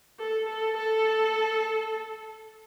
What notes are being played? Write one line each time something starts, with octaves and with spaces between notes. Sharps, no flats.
A4
A4
A4